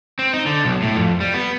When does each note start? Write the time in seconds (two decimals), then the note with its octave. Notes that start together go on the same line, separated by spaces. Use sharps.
0.19 C4
0.34 D#4
0.46 D3
0.65 B1
0.82 A2
0.96 F2
1.20 G3
1.34 B3